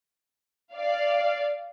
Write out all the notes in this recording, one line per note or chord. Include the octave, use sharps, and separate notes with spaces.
D5 F5